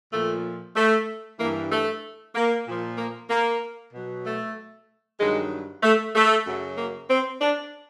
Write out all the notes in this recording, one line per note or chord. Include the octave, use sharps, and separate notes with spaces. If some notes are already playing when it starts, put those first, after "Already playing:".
A#2 F3 A3
A3
G2 E3 A#3
A3
A#3
A#2 F3
A#3
A#3
B2 F#3
A3
G2 D#3 F#3 G#3
A3
A3
F#2 C#3 F#3
A#3
C4
D4